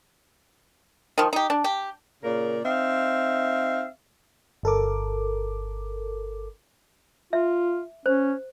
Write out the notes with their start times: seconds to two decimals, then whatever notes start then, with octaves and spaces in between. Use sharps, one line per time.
1.18 D#3 F3
1.33 D#4 G4
1.50 D4
1.64 G4
2.24 A#2 C#3 A#4 D5
2.64 C4 D#4 E5 F5
4.63 G1 A4 A#4 D6
7.33 F4 E5
8.06 C#4 C5